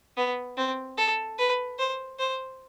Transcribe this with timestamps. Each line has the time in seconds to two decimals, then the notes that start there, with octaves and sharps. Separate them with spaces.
0.17 B3
0.57 C4
0.97 A4
1.38 B4
1.79 C5
2.19 C5